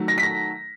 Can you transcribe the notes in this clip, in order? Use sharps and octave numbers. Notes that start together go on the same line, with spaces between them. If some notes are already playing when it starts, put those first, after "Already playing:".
Already playing: D#3 F#3 A3
A#6
B6
A#6